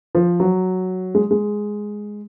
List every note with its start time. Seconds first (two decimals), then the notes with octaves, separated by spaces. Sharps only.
0.15 F3
0.40 F#3
1.15 G#3
1.31 G#3